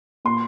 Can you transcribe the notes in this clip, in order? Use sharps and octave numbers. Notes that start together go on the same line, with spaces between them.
A#2 C6